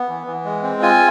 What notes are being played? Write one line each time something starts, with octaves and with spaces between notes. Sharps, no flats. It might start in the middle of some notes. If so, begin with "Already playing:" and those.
Already playing: B3
E3
E3
G#3
C4
F4 G#5